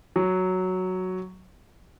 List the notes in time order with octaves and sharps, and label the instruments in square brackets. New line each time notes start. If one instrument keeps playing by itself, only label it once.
[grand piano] F#3